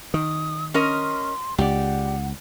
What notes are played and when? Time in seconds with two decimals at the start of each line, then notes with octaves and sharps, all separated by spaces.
0.14 D#3 D#6
0.74 C#4 A#4 D#5 C6
1.58 C#2 G4 D5 F#5